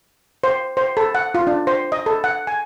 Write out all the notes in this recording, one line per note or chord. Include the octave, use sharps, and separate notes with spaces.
C5
C5
A4
F#5
F4
D4
C5
D#5
A4
F#5
G#5